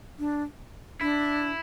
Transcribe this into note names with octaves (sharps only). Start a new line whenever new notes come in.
D4
D4 E4